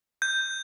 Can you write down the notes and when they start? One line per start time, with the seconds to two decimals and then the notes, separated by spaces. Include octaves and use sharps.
0.22 G6